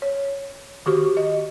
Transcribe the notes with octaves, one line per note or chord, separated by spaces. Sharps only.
C#5
D#3 F#4 G4 C#6
D#5